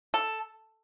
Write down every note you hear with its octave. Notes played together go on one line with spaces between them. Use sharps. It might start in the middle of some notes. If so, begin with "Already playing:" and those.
A4